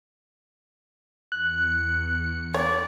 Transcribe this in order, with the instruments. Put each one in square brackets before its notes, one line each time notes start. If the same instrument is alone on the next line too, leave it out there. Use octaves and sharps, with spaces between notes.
[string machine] E2 C#7 [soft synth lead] F#6
[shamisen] C#5 [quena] D5